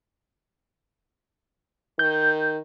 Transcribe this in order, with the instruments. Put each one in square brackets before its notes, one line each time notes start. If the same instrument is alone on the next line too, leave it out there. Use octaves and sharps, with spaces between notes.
[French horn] D#3 [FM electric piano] G6